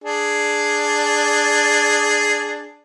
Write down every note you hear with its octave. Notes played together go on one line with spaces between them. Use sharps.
D4 G#4